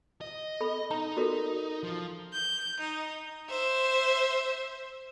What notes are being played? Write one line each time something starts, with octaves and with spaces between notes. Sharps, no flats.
D#5
A4 B5
D#4 A#5
F#4 A4 A#4
F3
G6
D#4
C5 E5